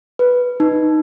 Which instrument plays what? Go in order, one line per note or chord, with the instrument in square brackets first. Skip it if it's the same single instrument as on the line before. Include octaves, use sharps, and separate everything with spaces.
[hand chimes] B4
D#4